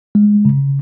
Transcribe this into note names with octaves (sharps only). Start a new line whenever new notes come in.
G#3
C#3